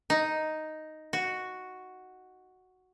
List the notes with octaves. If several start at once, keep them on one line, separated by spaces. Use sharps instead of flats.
D#4
F#4